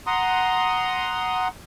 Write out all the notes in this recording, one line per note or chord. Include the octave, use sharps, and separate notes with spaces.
F#5 A#5 C6 D#6